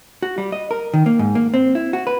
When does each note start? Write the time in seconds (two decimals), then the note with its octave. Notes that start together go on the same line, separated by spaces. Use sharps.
0.22 F#4
0.38 G3
0.52 D#5
0.71 A#4
0.94 D#3
1.06 A#3
1.19 G#2
1.35 A#3
1.54 C4
1.75 E4
1.93 F#4
2.07 B4